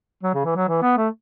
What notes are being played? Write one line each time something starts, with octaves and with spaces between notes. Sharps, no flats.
F#3
C#3
E3
F#3
E3
B3
A3